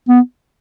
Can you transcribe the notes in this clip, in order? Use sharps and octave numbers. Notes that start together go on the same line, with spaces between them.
B3